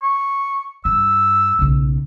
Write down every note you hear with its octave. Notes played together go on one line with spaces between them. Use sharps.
C#6
G2 E6
B1 C#3